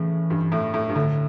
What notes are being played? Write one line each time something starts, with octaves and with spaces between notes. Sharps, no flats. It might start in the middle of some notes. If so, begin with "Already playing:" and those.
Already playing: A2 C#3 E3
G2
A2
A2
G2
A2 D3